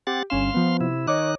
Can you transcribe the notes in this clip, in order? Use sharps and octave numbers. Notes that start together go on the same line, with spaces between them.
C4 G4 F#5 A6
G1 C#4 F5 C6 E7
F3 B3
C3 E4
D#3 D#4 C#5 D#5 D6 F#6